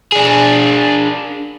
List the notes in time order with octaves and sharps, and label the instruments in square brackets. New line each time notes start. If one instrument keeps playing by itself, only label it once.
[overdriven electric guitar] D4 G#4